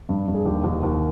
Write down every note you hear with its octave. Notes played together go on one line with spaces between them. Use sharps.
G2
G2
G#4
D#2 G4
D#2
D#2